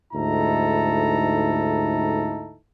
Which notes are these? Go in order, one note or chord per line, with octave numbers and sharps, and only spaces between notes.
D2 G#2 D#4 E4 A4 A#5